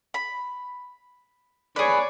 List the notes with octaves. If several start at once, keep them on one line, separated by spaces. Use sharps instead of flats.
B5
G#4 B4 C#5 D5